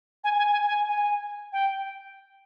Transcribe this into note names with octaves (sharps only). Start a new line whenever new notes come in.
G#5
G#5
G#5
G#5
G#5
G5